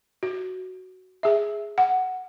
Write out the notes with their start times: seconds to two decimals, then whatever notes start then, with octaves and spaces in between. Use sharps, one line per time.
0.23 F#4
1.23 G#4 E5
1.78 F#5